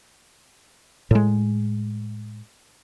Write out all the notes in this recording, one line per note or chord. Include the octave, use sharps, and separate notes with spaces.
A2 G#3